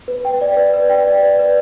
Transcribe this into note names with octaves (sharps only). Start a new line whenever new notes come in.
B4
G5
D5
B4
B4
G5
D5
B4
B4